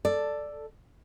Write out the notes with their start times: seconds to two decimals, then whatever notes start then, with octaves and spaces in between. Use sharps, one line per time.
0.05 A4 D5